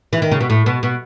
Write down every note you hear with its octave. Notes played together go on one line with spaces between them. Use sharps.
E3
D#3
C#3
B2
A2
B2
B2